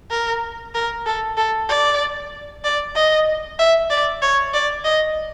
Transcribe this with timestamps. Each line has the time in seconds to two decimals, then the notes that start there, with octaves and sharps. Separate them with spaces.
0.11 A#4
0.74 A#4
1.06 A4
1.37 A4
1.69 D5
2.64 D5
2.95 D#5
3.59 E5
3.91 D5
4.22 C#5
4.54 D5
4.85 D#5